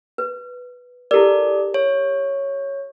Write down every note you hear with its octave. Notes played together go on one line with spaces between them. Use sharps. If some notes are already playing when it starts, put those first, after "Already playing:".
B4
E4 G4 A4 A#4 D5
C#5